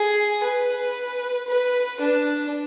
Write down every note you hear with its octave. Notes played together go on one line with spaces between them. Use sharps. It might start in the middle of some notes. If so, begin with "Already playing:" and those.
Already playing: G#4
B4
B4
D4